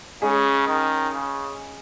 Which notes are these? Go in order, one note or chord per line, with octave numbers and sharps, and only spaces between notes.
C#3 G#3 C#4 G#4
D#3
C#3